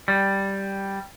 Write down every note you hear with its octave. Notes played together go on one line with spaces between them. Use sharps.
G3